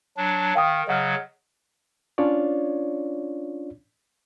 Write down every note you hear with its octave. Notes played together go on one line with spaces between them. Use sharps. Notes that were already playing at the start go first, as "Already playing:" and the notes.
F#3 D4
D#3 F5 G5 D#6
C#3 F#3 D#5 F#5 F6
C#4 D4 F4 C#5 D5